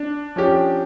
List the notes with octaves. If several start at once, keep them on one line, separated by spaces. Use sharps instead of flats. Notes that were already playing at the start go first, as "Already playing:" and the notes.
Already playing: D4
F3 C#4 G4